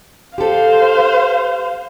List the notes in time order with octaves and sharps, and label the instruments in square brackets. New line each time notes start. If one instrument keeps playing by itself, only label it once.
[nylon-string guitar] G4 A4 [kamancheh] C5 F5